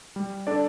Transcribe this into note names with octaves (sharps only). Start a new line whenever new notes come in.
G3
D4 A4 D5